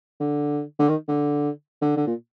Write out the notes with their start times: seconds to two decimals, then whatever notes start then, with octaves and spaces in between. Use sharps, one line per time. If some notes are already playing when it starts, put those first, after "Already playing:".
0.20 D3
0.79 D3
0.89 D#3
1.08 D3
1.82 D3
1.97 D3
2.07 A#2